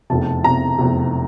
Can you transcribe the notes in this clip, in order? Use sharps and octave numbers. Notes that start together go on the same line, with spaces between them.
F1 E2 C3 A5
F1 E2 C3 A#5
F1 E2 C3